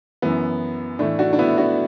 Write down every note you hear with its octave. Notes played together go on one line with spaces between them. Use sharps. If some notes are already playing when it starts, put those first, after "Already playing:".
F#2 E3 B3
A2 E3 A3 D4
D4 F#4
D4
B3 E4
D4 F#4